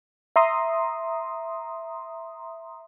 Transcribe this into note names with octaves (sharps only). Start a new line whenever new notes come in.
E5 A#5 C6 D#6